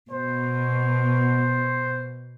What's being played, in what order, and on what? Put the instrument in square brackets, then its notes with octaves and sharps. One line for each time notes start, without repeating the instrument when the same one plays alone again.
[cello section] B2 [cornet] C5